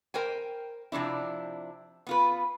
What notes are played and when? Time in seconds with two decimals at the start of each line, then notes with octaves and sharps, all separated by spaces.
0.14 A#4 C5 G5 G#5
0.92 C3 F3 D4 E4
2.07 B3 F4 B4